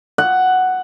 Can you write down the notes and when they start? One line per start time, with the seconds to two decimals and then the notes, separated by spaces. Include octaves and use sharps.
0.18 F#5